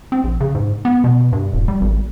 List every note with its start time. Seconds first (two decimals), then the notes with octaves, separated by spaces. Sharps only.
0.12 C4
0.24 A#1
0.40 C#3
0.55 G#2
0.85 B3
1.04 B2
1.32 G2
1.53 D#1
1.68 G3
1.81 G#1